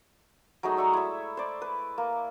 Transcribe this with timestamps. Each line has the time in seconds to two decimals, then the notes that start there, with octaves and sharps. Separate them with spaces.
0.63 F#3 G#3 A3 D#4
0.77 D5 E5 C#6 D#6
0.93 E4 E5
1.37 C5 D5
1.62 B4
1.98 A#3